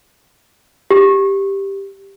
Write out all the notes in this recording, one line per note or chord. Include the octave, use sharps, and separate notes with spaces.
G4